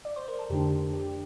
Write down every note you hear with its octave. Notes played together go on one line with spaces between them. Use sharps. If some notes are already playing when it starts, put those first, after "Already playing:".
D5
C5
A#4
A4
F2 D3 A3 D4 G4
G4